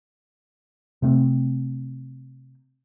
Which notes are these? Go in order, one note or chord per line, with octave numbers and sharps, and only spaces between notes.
C3 A3 C4